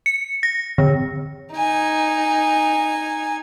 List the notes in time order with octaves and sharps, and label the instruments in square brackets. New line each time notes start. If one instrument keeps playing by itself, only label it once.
[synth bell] C#7
A#6
D3
[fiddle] D#4 G#5